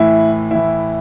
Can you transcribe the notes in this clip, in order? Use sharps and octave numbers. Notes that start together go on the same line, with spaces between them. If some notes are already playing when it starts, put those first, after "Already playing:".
Already playing: A2 E3 E4
A2 E3 E4